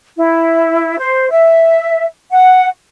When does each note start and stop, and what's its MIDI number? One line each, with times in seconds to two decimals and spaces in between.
0.17 0.97 64
0.98 1.30 72
1.30 2.05 76
2.31 2.67 78